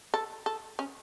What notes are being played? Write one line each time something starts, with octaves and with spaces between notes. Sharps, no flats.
A4
A4
C#4